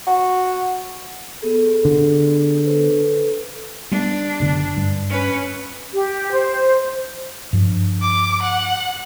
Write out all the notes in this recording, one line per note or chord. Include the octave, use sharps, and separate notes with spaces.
F#4
B3 G#4 A4
D3
A4 B4 C5
G3 B3 D4
F#1 A2 D3
G2
C#4 B4
G4
C5
G2 F3
D6
F#5